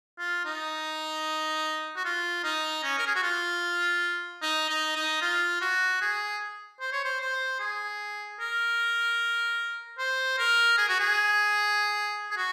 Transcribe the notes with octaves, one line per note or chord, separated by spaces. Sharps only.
F4
D#4
F#4
F4
D#4
C#4
A#4
G#4
F#4
F4
D#4
D#4
D#4
F4
F#4
G#4
C5
C#5
C5
C5
G#4
A#4
C5
A#4
G#4
F#4
G#4
G#4
F#4